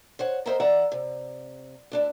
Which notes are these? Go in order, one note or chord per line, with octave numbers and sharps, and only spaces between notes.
C5 C#5 F#5
A#4 C5 D#5 E5 F#5 A#5
E3 D5 E5 F#5 A#5
C3
D2 D4 E4